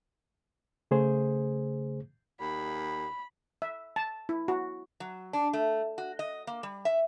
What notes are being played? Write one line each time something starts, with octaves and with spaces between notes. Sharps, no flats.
C#3 A3 G#4 C5
D#2 B5
E5
A5
E4
F#4
F#3
D4
A3
F#4
D#5
A#3
G3
E5